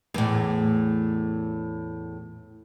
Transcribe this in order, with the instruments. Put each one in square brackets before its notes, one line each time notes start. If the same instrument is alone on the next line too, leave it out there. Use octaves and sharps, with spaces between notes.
[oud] E2 A2